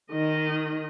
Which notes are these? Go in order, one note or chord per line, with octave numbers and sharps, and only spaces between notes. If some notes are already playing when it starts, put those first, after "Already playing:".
D#3 D#5